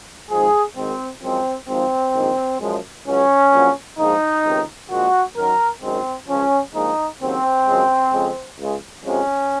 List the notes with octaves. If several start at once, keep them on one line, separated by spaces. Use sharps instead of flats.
G#1 G#2 F3 G#3 G#4
G#1 G#2 D#3 C4
F#2 F3 G#3 C4
G#1 G#2 F3 C4
A#1 G#2 D#3
F#2 F3 G#3
C#2 C#3 F#3 C#4
A#1 A#2 F#3
A#1 G#2 F3 G#3 D#4
C#2 C3 D#3
A#1 A#2 G#3 F#4
F#2 D#3 F#3 A#4
G#1 F#2 D#3 G#3 C4
C#2 C#3 F3 C#4
A#1 A#2 F3 G#3 D#4
D#2 C#3 F#3 C4
F#2 C#3 F3 G#3
F2 C#3 G#3
C#2 C#3 G#3
F2 C3 F3 G#3 C#4